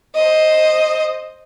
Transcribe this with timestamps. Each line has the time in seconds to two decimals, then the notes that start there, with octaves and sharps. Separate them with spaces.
0.15 C5 D#5